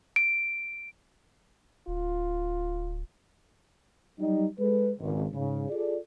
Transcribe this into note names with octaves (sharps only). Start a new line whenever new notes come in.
D7
D1 F4
F#3 G3 D#4
G#3 A4 B4
G#1 C#2
G#2 C#3
F4 G#4 A4 D5